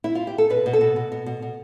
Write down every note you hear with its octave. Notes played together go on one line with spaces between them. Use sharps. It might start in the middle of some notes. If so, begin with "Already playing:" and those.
E4
F4
G4
A4
B2 B4
B2
A4
B2
B2
B2
B2
B2